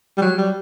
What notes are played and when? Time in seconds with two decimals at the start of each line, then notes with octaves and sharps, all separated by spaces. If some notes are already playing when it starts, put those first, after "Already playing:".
0.17 G3
0.22 F#3
0.38 G3